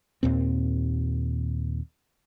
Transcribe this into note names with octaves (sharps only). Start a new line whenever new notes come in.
D#2 A#2 C4